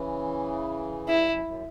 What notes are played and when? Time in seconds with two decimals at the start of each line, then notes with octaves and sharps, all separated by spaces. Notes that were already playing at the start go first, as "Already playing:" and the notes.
Already playing: C#3 E3
1.09 G2 E4
1.27 F#2
1.45 F#2